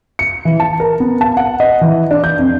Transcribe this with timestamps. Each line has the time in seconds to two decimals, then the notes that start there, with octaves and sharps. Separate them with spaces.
0.19 C#7
0.45 E3
0.60 A5
0.80 A#4
1.00 B3
1.21 A5
1.37 F#5
1.60 D#5
1.81 E3
2.11 D4
2.24 G6
2.39 F2